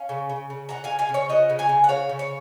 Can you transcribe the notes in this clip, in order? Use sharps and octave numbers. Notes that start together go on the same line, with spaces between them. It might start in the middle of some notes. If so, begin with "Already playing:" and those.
Already playing: C#4 F5 G#5
C#3
C#3
C#3
C#3 F#5 A#5
F5 G#5
C#3
F5 G#5
C#3
C#5 F5
F3 D#5 F#5
C#3
F5 G#5
C#3
F#5
C#3 C#5 F5
C#3
C#5 F5